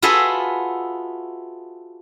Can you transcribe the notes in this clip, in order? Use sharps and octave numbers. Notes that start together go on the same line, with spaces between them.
F4 F#4 G#4 A4 B4 E5